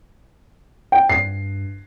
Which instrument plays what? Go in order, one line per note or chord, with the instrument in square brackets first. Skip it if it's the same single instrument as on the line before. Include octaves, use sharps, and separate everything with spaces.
[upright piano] G5
[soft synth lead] G2 [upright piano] C7